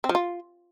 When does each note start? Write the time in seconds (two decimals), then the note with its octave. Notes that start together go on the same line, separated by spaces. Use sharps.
0.04 C4
0.09 F3
0.15 F4